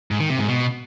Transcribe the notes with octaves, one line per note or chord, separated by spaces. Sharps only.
G#2
D#3
C3
G#2
B2